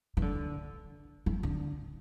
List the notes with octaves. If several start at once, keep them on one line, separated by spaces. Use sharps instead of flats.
E3
D3
E3
D3